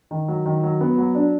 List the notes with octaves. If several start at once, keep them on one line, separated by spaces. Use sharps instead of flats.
D#3
F#3
D#3
F#3
B3
F#3
D4